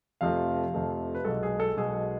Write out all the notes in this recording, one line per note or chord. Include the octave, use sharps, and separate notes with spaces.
F2 C3 F3 A3 F5
F2 C3 F3 A3
B4
B1 B2 G#3 A4
G#4
A4
B1 B2 G#3 G#4